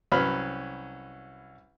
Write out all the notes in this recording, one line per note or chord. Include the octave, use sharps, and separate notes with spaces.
C2 F#3 C#4 B4 B5 F6